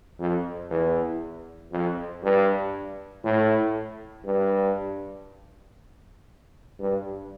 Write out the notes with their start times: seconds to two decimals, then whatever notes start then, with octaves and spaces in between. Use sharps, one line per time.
0.19 F2
0.70 E2
1.71 F2
2.23 G2
3.24 A2
4.25 G2
6.79 G2